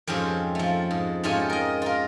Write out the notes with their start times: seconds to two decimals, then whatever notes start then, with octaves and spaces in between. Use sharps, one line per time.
0.07 F2 G#2 C4 C#4 G4
0.55 F3 A3
0.91 G#2
1.23 G#2 A3 C#4 F4 G4 G#5
1.50 A#4 D#5
1.82 F4 A#4